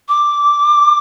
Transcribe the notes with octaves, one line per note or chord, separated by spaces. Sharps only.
D6